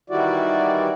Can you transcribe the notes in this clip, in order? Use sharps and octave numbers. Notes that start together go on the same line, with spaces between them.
D#3 E3 G3 E4 F#4 D5